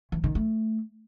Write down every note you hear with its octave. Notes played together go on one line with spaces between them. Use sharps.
E3
D#3
A3